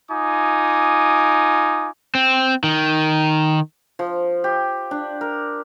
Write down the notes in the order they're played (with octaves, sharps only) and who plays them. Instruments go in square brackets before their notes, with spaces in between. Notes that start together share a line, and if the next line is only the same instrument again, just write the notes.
[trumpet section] D#4 F4 G#5 D6 D#6
[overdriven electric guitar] C4
D#3
[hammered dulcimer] F3
G4
D4
A#4